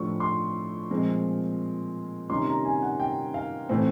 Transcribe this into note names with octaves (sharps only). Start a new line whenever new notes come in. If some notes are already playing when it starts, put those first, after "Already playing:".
Already playing: A2 F3 A3 D4 C#6
C6
A#2 F3 G#3 C4
C3 D#3 G3 A#3 C#4 C6
A#5
G#5
F#5
G5
F5
A2 E3 A3 C4 C5